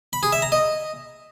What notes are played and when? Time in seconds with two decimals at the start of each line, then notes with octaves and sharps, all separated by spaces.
0.13 B5
0.23 G#4
0.33 E5
0.42 A#5
0.52 D#5